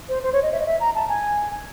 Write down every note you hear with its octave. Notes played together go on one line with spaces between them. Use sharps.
C5
C5
C#5
D#5
E5
D#5
E5
A#5
A5
G#5